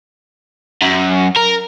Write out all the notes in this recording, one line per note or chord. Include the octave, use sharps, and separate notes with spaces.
F#2
A#4